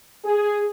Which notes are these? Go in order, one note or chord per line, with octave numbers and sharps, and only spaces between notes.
G#4